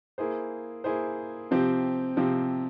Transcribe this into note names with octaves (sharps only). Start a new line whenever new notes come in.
A#3 E4 G#4 C5
A#3 E4 G#4 C5
C3 F3 C4 G4
C3 F3 C4 G4